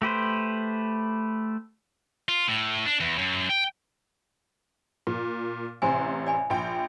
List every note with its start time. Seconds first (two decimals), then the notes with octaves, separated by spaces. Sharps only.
0.02 A3 G4 B4 C5
2.28 F4
2.48 A2
2.86 D4
3.00 E2
3.18 F#2
3.49 G5
5.07 A#2
5.82 A1 C3 C5 G#5 C6
6.27 D5 G#5 B5
6.50 A#1 G5